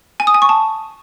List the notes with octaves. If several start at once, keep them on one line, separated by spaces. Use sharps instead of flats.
G#5
D#6
G#5
C#6
A5